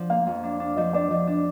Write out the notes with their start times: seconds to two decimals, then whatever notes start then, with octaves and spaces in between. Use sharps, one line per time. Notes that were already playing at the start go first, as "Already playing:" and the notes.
Already playing: F3 D4
0.10 A#3 F5
0.27 F2
0.44 D4
0.60 D4
0.76 F3 D#5
0.93 D4 D5
1.10 F3 D#5
1.27 D4